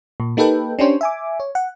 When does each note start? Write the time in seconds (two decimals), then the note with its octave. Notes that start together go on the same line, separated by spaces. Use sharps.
0.20 A#2
0.37 A#3 D#4 G4 A4 B4 G5
0.79 C#4 D4 G4 C5 C#5
1.01 E5 G#5 D6
1.40 C#5
1.55 F#5